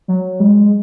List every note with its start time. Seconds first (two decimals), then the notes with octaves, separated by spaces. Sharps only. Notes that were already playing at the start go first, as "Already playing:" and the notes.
0.08 F#3
0.40 G#3